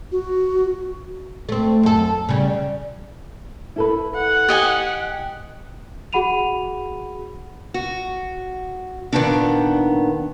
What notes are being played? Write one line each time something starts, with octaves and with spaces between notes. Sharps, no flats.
F#4
A3 C4
F#2 A4
C#3 G3
E4 A4 B4
F#5
G4 D#5 G#5
F#4 G#4 F#5 B5 D#7 F7
F#4
A#2 D#3 A#3 B3 C#4 D4